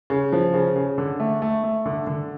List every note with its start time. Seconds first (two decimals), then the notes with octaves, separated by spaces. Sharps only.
0.10 C#3
0.33 F3
0.54 C#3
0.76 C#3
0.98 D3
1.20 A3
1.42 A3
1.63 A3
1.86 D3
2.07 D3